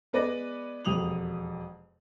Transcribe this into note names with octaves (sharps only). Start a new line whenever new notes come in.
G#3 B3 B4 D5 A#6
E1 F2 G4 D#6 F7 F#7